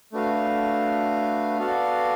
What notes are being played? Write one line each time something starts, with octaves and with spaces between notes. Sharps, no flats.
A3 D4 F#4 B4 F5
B3 F#4 A4 D5 F5